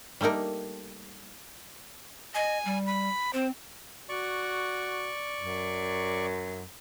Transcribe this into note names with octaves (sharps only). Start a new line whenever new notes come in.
G3 A3 A#3 D#4 A#4
D#5 G#5
G3
B5
C4 C5
F#4 D5 C#6
F#2